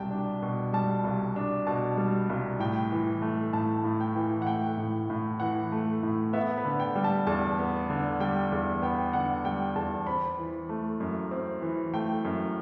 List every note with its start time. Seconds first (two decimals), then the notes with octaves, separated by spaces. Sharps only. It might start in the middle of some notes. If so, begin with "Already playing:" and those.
Already playing: C2 B2 G3 G5 A5
0.11 D4
0.42 B2
0.73 G3 A5
1.04 C2
1.36 D4
1.67 B2 A5
1.97 G3
2.30 C2
2.60 A2 G5
2.92 E3
3.22 A3
3.53 A2 A5
3.84 A2
4.00 G5
4.16 E3
4.42 F#5
4.47 A3 G5
4.77 A2
5.10 A2
5.40 E3 F#5
5.72 A3
6.03 A2
6.33 B3 E5
6.58 B4
6.65 D3
6.80 G5
6.95 G3
7.04 A5
7.27 E2 A5
7.59 B3
7.90 D3
8.20 G3 G5
8.52 E2
8.82 B3 G5
9.13 D3 F#5
9.45 G3 G5
9.76 E2 A5
10.07 C4 B5
10.38 E3
10.69 A3
11.00 F#2
11.31 C4
11.62 E3
11.93 A3 G5
12.25 F#2